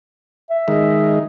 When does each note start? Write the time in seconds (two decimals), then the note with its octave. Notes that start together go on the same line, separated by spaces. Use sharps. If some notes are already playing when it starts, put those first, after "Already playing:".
0.50 E5
0.68 D#3 G#3